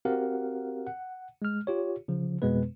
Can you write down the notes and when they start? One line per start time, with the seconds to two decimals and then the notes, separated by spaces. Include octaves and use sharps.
0.05 C4 F#4 G4 A#4 F5 F#5
0.87 F#5
1.42 G#3 F6
1.67 F4 G4 C#5
2.08 C#3 F3
2.42 F2 B2 G#3 B3 B4